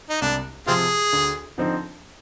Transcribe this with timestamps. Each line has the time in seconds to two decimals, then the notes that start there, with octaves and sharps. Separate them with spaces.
0.10 D#4
0.21 C2 D4
0.67 C3 F3 C4 F4 G#4
1.13 D2
1.58 D3 F3 C4 D#4